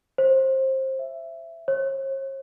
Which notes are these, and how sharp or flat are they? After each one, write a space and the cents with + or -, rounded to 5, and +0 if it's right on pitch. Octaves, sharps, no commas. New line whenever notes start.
C5 +20
E5 +10
C#5 -45